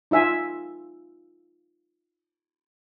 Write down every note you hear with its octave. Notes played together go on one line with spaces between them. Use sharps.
D#4 F4 E5 G#5